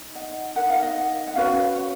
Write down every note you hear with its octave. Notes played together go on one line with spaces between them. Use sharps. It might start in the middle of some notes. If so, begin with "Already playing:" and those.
Already playing: D#4
D#5 F#5
D#4 A#4 F#5
F5
D#5 F#5
F#5
C#4 F#4 B4 C#5 F5
C#5